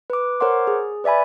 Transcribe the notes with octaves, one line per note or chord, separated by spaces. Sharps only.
B4 D6
A#4 C5 C#5 F#5 C6 D6
G#4
B4 D5 E5 G#5 B5